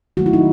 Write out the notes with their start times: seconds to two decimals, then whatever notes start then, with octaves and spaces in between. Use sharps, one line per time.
0.17 D#3 F#3 A3 F#4
0.26 E4
0.33 D#4